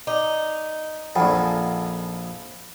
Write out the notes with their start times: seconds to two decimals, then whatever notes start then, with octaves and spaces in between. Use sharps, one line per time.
0.07 D#4 D5 D6
1.16 A#1 F2 A4 F5 F#5 G#5 B5